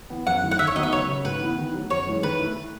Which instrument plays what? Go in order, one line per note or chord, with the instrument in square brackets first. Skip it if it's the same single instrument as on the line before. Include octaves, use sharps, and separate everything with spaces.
[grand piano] E3 B3
[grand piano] F#2 [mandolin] F#5
[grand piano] D#3 A3 E4
[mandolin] F#5
[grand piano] D#2 [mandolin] E5
[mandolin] C#5
[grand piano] D#3 F#3 B3 D#4 [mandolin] D#5
[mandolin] E5
[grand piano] C#2 [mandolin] C#5
[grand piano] C#3 F#3
[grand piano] G#2 [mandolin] B4
[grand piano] E3 B3 E4
D#3
F#3 A3
[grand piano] F#2 [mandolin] C#5
[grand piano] E3 G#3 C#4
[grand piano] D#3 [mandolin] B4
[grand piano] A3 E4